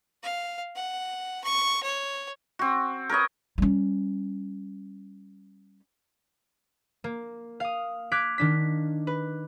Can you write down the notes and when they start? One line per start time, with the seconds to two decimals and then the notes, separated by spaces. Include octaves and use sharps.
0.23 F5
0.75 F#5
1.44 C#6
1.83 C#5
2.59 C4 F#4
3.09 A#4 B4 C#5 D#5
3.58 G3 C#4
7.04 A#3
7.60 F5 D#6
8.12 D6 F6 F#6 G#6 B6 D7
8.38 D#3 D4 B6
9.07 B4